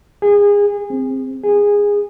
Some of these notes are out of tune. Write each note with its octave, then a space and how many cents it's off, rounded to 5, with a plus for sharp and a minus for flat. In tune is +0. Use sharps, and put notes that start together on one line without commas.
G#4 -25
C4 +5
G#4 -15